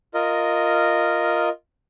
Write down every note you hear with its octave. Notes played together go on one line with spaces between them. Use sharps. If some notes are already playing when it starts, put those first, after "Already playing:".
F4 A#4 D#5